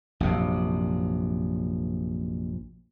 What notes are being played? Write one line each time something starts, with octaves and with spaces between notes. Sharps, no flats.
A#1 F#2 C3